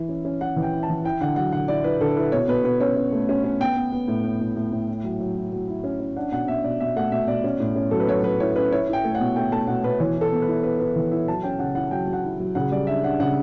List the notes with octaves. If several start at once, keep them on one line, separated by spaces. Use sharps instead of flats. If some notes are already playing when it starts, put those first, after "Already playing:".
Already playing: E3 E4
C#4
C#4
C#4 F#5
E3
G5
E4
A5
E3
E4 G5
D3 F#5
F#3 F#5
D3 F#5
E4 D5
E4 B4
D3 A4
E4 B4
B2 C#5
B2 B4
B2 B4
C#4 C#5
C#4
A3
C#4
C#4
B3 G5
B3
B3
A2
B3
A2
A2
A2
E4
F#3
F#3
E4
F#3
E4
C#4
C#4
D4 F#5
B2 F#5
B2 E5
B2 D5
B2 E5
A3 F#5
B2 E5
B2 D5
C#4
A2
C#4
F#3 A4
B4
F#3 C#5
F#3 B4
E4 C#5
C#4 B4
E4 C#5
E4
G5
A3
F#5
B2
A3 G5
A3 A5
B2 F#5
B2 B4
E3 C#5
E4
A4
B3
B4
E4
B3 B4
E4 B4
E3
E4 E5
F#3 A5
C#4 G5
C#3 F#5
E4 F#5
F#3 G5
F#3
F#5
E4
F#3
C#3 F#5
G3 D5
D4 E5
D4 F#5
C#3 F#5